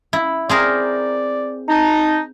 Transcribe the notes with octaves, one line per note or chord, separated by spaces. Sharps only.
E4
C4 G#4 A#4 D5
D#4 A5